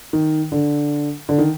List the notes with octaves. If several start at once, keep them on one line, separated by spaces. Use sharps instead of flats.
D#3
D3
D3
D#3